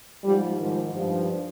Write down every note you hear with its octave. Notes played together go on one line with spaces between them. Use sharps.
G#2 F3 G3
G#2 D#3 F3
G2 F3